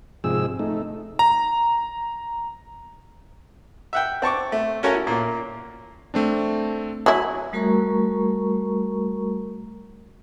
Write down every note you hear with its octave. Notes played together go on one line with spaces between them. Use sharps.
G#2 C3 F3 G#4 E6
A3 D#4
A#5
E5 F#5 G5
C4 A5 C#6 D6
A3
C#4 F#4 A4 A#4 C#5 G#5
E4
A#2 A#3
A3 C4 D4
F#3 E4 G#5
G3 A3 F#4 A#4 A#5 C#6